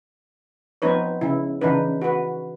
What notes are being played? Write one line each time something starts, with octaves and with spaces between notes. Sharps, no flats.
F3 B3 C4 D#4 B4 C#5
C#3 E4
C#3 E3 D4 D#4 B4
F#4 B4